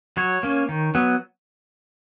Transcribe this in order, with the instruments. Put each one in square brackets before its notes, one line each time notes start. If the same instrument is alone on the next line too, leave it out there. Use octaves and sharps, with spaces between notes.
[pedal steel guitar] F#3 C#5
A#3 C#4
D#3
F#3 B3